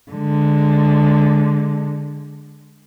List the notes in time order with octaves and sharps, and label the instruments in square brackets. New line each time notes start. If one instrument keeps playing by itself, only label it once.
[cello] D3 G#3